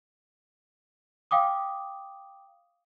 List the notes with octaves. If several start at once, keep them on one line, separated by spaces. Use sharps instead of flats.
F5 G5 D6 D#6